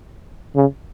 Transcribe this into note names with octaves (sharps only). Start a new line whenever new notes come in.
C#3